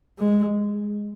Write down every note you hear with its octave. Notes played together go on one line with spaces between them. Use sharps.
G#3